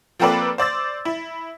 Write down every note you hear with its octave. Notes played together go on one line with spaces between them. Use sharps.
F3 A#3 C4 A4 B4 D5
C5 D5 E6 A6
E4